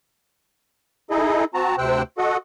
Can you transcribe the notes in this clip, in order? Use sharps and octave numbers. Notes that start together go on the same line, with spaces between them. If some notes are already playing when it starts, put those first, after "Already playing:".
D#4 E4 G#4 A4 D#5
C4 F#4 A5 A#5
D2 C3 C5 G5 E6 F#6
F#4 A4 D#5 F#5